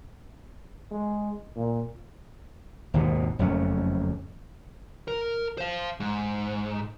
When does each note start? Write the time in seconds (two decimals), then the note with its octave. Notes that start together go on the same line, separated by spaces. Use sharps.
0.91 G#3
1.56 A#2
2.94 G#1 D#2 B2
3.39 F#1 F2 A3 C#4
5.08 A#4
5.58 C5 F5
6.00 G#2